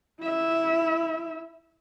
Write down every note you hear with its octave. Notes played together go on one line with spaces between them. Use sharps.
E4 E5